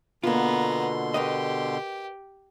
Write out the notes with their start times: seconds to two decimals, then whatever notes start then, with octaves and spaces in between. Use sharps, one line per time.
0.24 B2 D3 A#3 B3 F4 A#5 C6
1.14 G4 A#4 B4 D#5